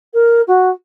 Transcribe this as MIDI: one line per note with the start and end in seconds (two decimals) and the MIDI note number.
0.14 0.41 70
0.47 0.69 66